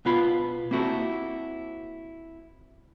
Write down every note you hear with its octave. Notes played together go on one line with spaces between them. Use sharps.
B2 B3 F4 B5
A#3 C4 E4 F#4 A4